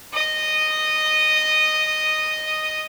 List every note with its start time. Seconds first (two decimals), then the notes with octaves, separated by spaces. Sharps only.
0.13 D#5 D#6